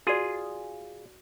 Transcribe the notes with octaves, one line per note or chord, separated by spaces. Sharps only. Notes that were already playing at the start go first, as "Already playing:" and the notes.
F4 F#4 G#4 D5